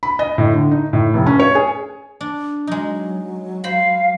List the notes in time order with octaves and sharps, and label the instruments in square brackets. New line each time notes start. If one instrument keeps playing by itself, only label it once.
[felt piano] B5
D#5
A2
D3
D#4
A2
F1
C#4
C#5
G#4
[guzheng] D4
[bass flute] F#3 [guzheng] G#3 D#4
[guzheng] C5 B5 C6 [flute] F5